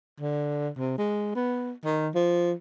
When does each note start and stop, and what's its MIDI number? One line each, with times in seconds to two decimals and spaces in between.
0.20 0.70 50
0.77 0.96 48
0.98 1.34 56
1.35 1.72 59
1.85 2.10 51
2.15 2.53 53